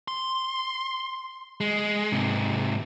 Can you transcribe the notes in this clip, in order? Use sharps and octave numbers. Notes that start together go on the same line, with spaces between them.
C6
G#3
G#2 C3